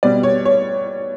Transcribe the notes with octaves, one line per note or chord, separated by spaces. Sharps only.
B2 G3 D5
C#5
C#5